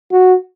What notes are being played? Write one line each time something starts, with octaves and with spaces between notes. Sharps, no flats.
F#4